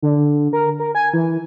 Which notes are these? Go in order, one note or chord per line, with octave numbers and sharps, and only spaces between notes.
D3
A#4
A#4
G#5
E3